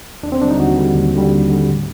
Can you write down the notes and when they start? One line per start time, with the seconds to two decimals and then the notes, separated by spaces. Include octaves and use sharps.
0.23 D#2 D4
0.32 C4
0.41 D3 G3 D4
0.50 D#4
0.60 D#2 F#4
0.78 D3 G3
0.95 D#2
1.14 D3 G3
1.32 D#2
1.50 D3 G3
1.68 A2